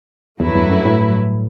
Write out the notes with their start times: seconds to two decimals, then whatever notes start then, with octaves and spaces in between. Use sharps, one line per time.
0.40 E2 G2 F#3 A3 E4 B4
0.55 E2
0.70 F#2
0.85 A2